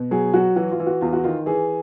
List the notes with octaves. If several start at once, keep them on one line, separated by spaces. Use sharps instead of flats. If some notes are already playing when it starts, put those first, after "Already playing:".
Already playing: B2
F#3 G#4
F#3 F#4
E3 F#4
F4
E3
F#4
E2 F4
F#4
D#3 F4
E3 G#4